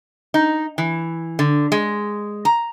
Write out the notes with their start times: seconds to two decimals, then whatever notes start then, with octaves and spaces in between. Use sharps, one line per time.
0.34 D#4
0.78 E3
1.39 D3
1.72 G#3
2.45 A#5